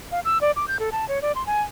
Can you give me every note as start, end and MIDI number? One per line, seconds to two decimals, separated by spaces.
0.12 0.20 77
0.25 0.38 88
0.41 0.51 74
0.56 0.65 86
0.68 0.77 91
0.79 0.90 69
0.92 1.08 81
1.08 1.20 73
1.22 1.32 74
1.35 1.45 84
1.47 1.62 80